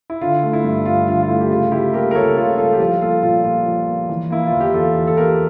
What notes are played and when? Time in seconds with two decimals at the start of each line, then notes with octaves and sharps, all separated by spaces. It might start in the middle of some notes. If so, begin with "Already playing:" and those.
0.10 E4
0.21 D3 F4
0.43 A3
0.53 E4
0.64 G2
0.85 G2 F4
1.07 D3 F4
1.22 F4
1.28 A3 E4
1.41 G4
1.51 C#3 F4
1.71 G3 E4 G4
1.93 A#3 G4 A#4
2.11 A#4
2.15 C#2 A4 C#5
2.36 C#3 F4 A4
2.58 G3 F4 A4
2.73 G4
2.80 F3 F4
3.01 A#3 F4 A4
3.23 A#2 F4
3.44 A#2 F4
3.66 F3
3.88 A#3
4.09 E3
4.30 A#3 E4
4.47 F4
4.52 E2
4.60 G4
4.74 E2 F4 A4
4.96 E3
5.07 A4
5.17 A#3 G4 A#4